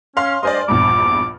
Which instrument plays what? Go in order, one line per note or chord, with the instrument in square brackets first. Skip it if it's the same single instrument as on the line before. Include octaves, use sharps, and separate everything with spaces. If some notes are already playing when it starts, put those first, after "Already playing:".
[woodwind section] C#4 [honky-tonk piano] F5 C6 F6
[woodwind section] G2 C5 D#5 [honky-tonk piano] D5 G#5 C6
[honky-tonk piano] A#1 E2 G2 [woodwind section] D6